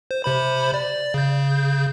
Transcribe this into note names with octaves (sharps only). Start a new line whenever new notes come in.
C5
C3 C5 B5
D5
C#3 G6